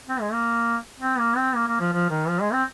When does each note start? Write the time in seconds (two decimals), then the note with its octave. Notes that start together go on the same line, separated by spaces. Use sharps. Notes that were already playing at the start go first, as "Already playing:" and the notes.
0.09 C4
0.21 G#3
0.33 A#3
1.00 C4
1.19 A#3
1.37 C4
1.55 A#3
1.68 A#3
1.80 F3
1.93 F3
2.10 D#3
2.28 F3
2.41 G#3
2.53 C4